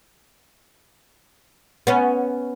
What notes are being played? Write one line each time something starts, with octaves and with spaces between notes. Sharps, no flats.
B3 C#4